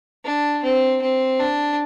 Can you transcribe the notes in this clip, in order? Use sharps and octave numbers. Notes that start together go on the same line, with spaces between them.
D4
C4
C4
D4